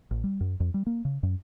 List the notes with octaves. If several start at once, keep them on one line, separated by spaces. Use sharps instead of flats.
A1
G3
F#2
F2
G3
A#3
C#3
F#2